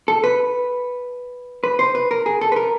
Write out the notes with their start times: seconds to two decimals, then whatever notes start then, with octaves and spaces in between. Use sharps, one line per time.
0.08 A4
0.24 B4
1.64 B4
1.79 C5
1.95 B4
2.11 A#4
2.26 G#4
2.41 A4
2.52 B4
2.56 A#4